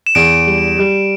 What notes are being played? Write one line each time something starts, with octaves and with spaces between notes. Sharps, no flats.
E7
E2 D7
G3
G3